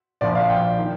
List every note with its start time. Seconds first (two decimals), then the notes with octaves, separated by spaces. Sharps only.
0.21 A#1 A#2 F3 D5
0.35 F5
0.50 G5
0.78 D#3